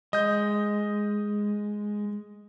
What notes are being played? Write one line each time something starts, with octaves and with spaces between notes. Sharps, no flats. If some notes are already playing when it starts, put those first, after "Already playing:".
G#3 D#5 G6